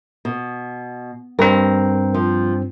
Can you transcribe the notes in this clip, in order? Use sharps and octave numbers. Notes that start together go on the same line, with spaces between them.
B2
G2 C4 A#4
F3